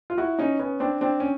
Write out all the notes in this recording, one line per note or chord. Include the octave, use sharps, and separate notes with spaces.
F4
E4 F#4
C#4 D#4
B3 C#4
C4 D4
C4 D4
C#4